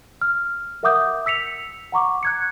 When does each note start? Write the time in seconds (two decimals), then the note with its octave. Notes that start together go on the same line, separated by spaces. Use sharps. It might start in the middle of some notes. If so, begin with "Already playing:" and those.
0.22 F6
0.83 A#4 E5 F#5 D6 D#6 G6
1.26 E6 B6 C#7 F7
1.92 F#5 A#5 C#6 D6
2.23 F#6 G#6 C#7